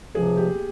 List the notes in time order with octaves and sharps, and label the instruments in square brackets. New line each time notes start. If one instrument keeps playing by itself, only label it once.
[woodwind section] C#2 C3 F3 [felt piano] G#4
[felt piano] G4